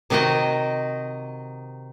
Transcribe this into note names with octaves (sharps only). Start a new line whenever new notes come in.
C3 D#3 D#4 F#4 D#5